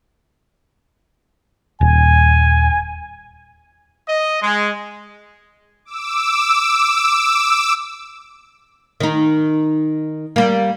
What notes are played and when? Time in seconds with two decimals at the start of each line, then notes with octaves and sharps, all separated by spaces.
1.81 D#1 G#5
4.08 D#5
4.42 G#3
5.85 D6 E6
9.00 D#3 D#4
10.36 G3 A#3